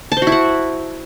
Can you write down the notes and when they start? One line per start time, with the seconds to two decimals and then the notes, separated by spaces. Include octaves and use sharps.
0.12 A5
0.17 C5
0.22 F#4
0.27 E4
0.32 F#5